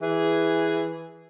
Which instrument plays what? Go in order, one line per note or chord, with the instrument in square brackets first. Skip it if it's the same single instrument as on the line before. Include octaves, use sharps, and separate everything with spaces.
[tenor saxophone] E3 [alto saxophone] G#4